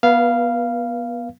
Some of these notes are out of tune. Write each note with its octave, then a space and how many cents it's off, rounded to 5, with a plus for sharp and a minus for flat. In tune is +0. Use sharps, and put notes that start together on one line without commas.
B3 -20 B4 -40 F5 -10